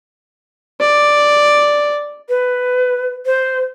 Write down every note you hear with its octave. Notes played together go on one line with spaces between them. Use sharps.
D5
B4
C5